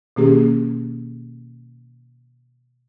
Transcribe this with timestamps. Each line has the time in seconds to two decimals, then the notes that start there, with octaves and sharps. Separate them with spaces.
0.16 B2 D#3 A#3 C#4 G4 G#4